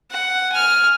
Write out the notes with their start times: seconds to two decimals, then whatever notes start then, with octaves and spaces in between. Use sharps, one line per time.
0.11 F#5
0.52 G#5 F6